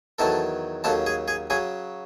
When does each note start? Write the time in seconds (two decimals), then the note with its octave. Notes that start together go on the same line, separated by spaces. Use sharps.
0.19 E2 D#3 F#3 A4 A5
0.84 D#2 C#3 F#3 A4 A5
1.06 G#4 G#5
1.28 G#4 G#5
1.50 C#3 F#3 G#4 G#5